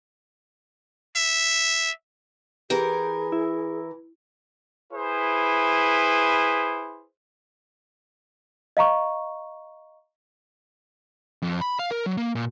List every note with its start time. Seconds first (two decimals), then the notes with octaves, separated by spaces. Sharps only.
1.16 E5
2.70 E3 G4 G#4 A#4
3.32 E4
4.92 E4 G#4 B4 C5
8.77 D#5 F5 A#5 C#6
11.42 F2
11.61 B5
11.79 F5
11.91 A#4
12.06 F#3
12.17 A#3
12.35 A#2